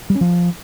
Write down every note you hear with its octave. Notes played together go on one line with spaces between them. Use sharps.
G3
C#4
F3